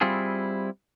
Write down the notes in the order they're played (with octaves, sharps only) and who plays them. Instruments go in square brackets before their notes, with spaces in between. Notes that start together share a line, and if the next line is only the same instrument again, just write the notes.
[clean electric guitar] G3 C4 E4 F4 G#4